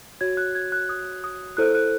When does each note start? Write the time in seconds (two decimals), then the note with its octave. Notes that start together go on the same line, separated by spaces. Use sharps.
0.21 F#4 C#5 G#6
0.37 F#6
0.55 G#6
0.72 F#6
0.89 D#6
1.24 D#6
1.57 E4 A4 C5 F#6
1.75 F#6